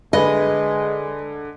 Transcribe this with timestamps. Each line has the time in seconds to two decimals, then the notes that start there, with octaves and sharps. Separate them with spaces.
0.13 D3 G#3 B4 D#5